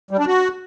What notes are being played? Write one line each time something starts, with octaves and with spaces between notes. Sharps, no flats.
G3
D4
F#4